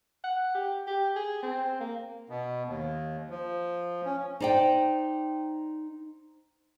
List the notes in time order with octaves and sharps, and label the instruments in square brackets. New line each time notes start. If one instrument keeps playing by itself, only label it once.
[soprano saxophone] F#5
G4
G4
G#4
C4
A#3
[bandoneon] B2
D#2
F3
C#4
[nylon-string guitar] D#4 D5 G5 [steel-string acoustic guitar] C5